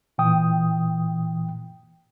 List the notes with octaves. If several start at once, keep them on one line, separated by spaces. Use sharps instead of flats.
A#2 E3 G5 D#6